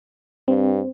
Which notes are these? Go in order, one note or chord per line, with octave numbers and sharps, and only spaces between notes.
G2 C4